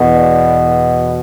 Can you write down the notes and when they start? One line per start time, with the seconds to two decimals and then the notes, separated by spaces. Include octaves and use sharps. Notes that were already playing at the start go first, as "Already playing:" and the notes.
Already playing: E2 B2
0.15 D5